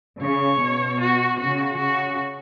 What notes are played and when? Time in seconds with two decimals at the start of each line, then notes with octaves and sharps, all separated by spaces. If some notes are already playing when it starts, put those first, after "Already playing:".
0.21 C#3 C#5
0.60 B2
1.00 F#4
1.39 C#3 F#4
1.77 C#3 F#4